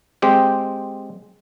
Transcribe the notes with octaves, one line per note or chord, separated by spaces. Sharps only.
G#3 C4 G4 G5